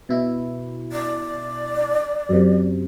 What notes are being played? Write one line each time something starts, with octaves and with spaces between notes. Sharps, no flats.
B2 E4
D5
F#2 C3